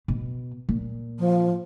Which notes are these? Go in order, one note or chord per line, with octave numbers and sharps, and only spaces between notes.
B2
A#2
F3